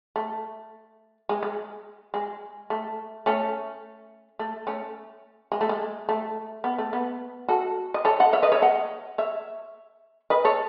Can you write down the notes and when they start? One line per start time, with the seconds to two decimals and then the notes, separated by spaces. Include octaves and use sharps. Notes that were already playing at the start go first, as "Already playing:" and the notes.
0.16 A3
1.29 G#3
1.43 G#3
2.14 G#3
2.70 A3
3.26 A3 C#4
4.39 A3
4.67 A3 C#4
5.52 G#3
5.61 A3
5.69 G#3
6.09 A3
6.64 B3
6.78 A3
6.93 B3
7.48 F#4 A4
7.94 D#5
8.05 A4 C#5
8.20 D#5 F#5
8.33 C#5 E5
8.42 B4 D#5
8.52 C#5 E5
8.62 D#5 F#5
9.18 C#5 E5
10.30 B4 D#5
10.44 A4 C#5